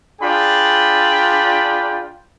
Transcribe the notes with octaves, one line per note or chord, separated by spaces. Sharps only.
D4 F4 G#4 D5 G5 B5